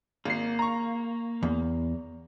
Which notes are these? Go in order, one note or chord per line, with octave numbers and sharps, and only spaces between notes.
G#1 A#3 C7
A#5 C#6
E2